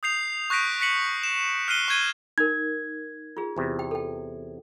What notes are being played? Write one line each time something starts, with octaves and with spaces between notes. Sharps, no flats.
D#6 G6 C7 F7
C#6 F#6 G6 A#6 B6 D7
F#6 A#6 B6 C#7 F#7
E7
F6 F#6 C7 C#7 D#7 G7
C#6 G6 G#6 D#7 G7
D#4 A#4 G#6
F4 G#4
E2 C3
G5
A4 G5